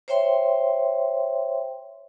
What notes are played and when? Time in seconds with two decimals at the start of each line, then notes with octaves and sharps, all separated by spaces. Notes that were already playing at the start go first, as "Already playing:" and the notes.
0.08 C5 C#5 E5 G5 C6